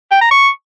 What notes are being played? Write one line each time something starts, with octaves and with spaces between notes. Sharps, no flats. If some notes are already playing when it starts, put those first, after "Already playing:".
G5
A#5
C#6